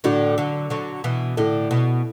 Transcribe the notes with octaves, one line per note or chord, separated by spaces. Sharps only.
A2 D3 D4 F#4
D3 F#3
D3 F#3
B2 E3
A2 D3 E4 A4
B2